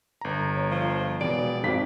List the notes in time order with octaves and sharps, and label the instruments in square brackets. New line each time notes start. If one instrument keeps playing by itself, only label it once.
[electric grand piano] G1 A#5
[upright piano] C#5
[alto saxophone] F3
[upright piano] E1 [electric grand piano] B3 D7 [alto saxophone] D5
[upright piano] G#1 B6 [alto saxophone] F3